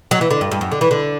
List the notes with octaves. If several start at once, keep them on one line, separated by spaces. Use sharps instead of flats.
F#3
E3
D3
G2
G2
F#2
D3
E3
D3